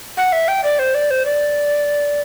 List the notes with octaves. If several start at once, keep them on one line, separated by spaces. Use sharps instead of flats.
F#5
E5
G5
D5
C5
D5
C5
D5